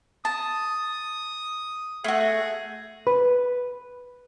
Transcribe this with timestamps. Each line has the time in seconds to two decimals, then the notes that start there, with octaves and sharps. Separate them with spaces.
0.25 A5 D#6
2.04 A3 F#4 G#4
3.07 B4